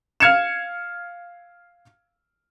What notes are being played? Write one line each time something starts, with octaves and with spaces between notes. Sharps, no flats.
F5 F6 G#6 C#7 E7